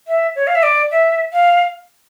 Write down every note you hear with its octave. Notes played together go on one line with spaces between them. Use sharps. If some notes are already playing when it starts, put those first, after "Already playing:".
E5
C#5
F5
E5
D5
E5
F5